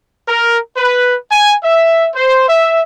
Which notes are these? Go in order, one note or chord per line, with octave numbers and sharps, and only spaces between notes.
A#4
B4
G#5
E5
C5
E5